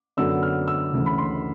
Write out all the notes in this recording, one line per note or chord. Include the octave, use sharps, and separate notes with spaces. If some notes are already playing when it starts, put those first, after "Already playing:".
F#2 D3 F#3 B3 E6
F6
E6
D2 C#3 E3
B5
C6